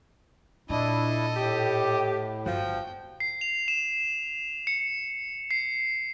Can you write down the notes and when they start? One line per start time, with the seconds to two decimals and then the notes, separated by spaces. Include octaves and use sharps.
0.70 A#2 D4 E4 A4 D#5
1.36 A2 G4
2.46 G1 F3 F#4 G5
3.20 C7
3.41 F7
3.68 E7
4.67 C#7
5.51 C7